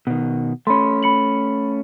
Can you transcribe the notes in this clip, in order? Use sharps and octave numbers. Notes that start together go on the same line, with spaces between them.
B2 D#3
A3 C#4 B5 C6
B5 C#7 F#7